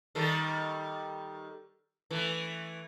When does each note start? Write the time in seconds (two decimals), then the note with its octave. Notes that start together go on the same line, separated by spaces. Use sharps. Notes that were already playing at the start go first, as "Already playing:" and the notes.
0.15 D#3 G3 A4
2.11 E3 A3